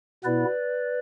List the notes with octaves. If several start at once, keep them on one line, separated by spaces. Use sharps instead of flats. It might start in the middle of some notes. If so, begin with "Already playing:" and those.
B2 B3 E4 B4 D5